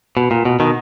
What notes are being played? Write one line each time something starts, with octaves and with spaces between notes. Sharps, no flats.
B2
A#2
B2
B2 D#3